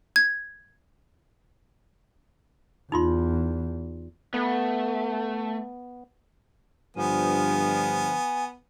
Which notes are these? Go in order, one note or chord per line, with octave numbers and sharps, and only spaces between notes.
G#6
E2 D#4 F4 C6
A3 B3
G2 D3 F3 B3 G#5